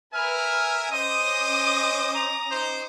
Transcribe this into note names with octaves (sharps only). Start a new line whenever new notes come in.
A#4 B4 E5 G#5 F6
C#4 C5 D#5 D6 D#6 D#7
A#5
D#4 C5